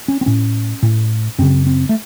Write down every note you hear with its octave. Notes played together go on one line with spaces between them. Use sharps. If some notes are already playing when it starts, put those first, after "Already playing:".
C#4
C4
A2 C#4
A2
F#2 C#3 C4
C4
A3